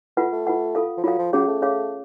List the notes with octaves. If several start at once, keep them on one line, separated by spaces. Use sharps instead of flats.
A3 F4 B4 F#5
A3
F4 B4 F#5
F4 A4 F5
F3
F#3 F4 A4 F5
F3
F#3 C#4 G#4 C#5 F5
A3
C#4 G#4 C#5 F5